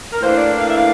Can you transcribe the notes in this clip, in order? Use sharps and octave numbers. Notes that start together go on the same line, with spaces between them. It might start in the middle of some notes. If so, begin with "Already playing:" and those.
A#4
A2 E3 A#3 D4 C5
D5
F5
E5
F5